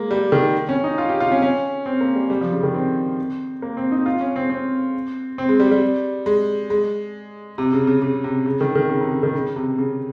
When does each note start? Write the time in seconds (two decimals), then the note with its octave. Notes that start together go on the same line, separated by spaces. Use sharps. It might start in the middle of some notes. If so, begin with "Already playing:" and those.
Already playing: G#3 A#3
0.11 G3
0.32 D#3
0.69 C#4
0.84 D#4
0.98 F4
1.09 G4
1.20 F4
1.32 C#4
1.42 C#4
1.86 C4
2.01 A#3
2.15 G3
2.30 G3
2.41 F3
2.52 C#3
2.63 D#3
2.74 C4
3.62 A#3
3.77 C4
3.92 D#4
4.06 F4
4.21 C#4
4.36 C4
4.50 C4
5.38 C4
5.49 G#3
5.60 G3
5.71 G3
6.26 G#3
6.70 G#3
7.58 C3
7.73 C#3
7.87 C#3
8.02 C#3
8.24 C3
8.46 C#3
8.61 D#3
8.75 D#3
8.90 C#3
9.01 C3
9.12 C#3
9.23 D#3
9.34 C#3
9.56 C3
9.78 C#3